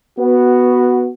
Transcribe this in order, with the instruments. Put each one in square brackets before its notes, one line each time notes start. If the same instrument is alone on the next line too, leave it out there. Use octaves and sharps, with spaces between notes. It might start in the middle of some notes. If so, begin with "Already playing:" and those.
[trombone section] B3 F#4